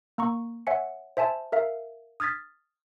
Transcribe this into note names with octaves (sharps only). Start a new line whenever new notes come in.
A#3 A#5 C#6
C#5 E5 F#5 G#5 C#7
C5 E5 G#5 A5
A#4 E5 F5
D#6 F6 G#6 A6 B6